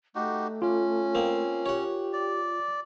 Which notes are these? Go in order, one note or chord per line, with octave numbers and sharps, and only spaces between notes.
A3 D#4 F#4 G4
C#4 F4
A#3 C4
G4 C#5 F#5
D5